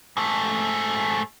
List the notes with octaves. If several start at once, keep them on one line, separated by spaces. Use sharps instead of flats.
G#2 A3